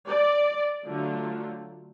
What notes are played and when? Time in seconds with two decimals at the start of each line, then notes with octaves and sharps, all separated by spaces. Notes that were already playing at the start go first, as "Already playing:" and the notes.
0.08 D5
0.86 D3 F#3 A3 F4